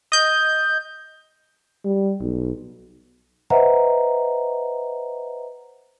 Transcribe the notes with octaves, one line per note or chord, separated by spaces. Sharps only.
D#5 G6
G3
B1
B4 C5 D#5 E5 F#5 A#5